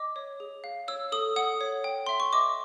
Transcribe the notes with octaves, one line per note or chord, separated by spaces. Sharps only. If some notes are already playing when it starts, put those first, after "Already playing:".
Already playing: D#5 D6
C#5
G#4
F5
C#5 E6
A4 D#6
F#5 D#6
C#5
G5
E5 C6
C#6
D#5 D6